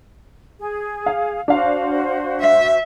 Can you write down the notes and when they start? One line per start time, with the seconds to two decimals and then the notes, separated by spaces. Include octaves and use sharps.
0.60 G#4
1.06 F5
1.48 D4 F#4 C5 F5
2.40 E5